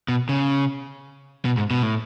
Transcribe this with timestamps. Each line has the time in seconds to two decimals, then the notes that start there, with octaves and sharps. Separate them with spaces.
0.08 B2
0.29 C#3
1.45 B2
1.57 G#2
1.71 B2
1.83 A2